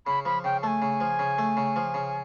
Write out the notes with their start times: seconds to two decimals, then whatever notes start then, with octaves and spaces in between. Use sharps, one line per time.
0.06 C#3 B5
0.25 F3 B5
0.44 C#3 G5
0.62 A3 G#5 A5
0.82 C#3
1.00 F3
1.19 C#3
1.38 A3
1.57 C#3
1.76 F3
1.94 C#3